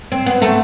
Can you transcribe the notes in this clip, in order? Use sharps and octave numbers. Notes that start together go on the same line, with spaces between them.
C4
B3
A3